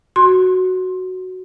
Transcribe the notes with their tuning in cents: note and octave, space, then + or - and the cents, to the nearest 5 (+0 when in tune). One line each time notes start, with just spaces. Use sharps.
F#4 +0 C6 +15